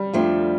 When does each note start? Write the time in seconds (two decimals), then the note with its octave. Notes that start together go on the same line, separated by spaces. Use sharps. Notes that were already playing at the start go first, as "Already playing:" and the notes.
Already playing: G3
0.13 F2 F3 A3 D4